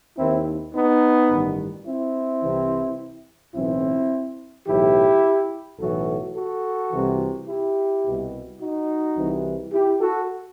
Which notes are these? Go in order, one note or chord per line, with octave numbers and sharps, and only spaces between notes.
D#2 D#3 C4 E4
B3 D#4
A1 G2 D#3
C4 E4
C2 C3 E3
B1 A2 E3 C4 E4
B1 A2 E3 E4 G4
B1 A2 E3 F#4 A4
F#4 A4
C2 C3 E3
E4 G4
C2 B2
D#4 F#4
C2 C3 E3
E4 G4
F#4 A4